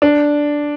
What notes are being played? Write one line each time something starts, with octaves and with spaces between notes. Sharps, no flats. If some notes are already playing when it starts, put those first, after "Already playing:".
D4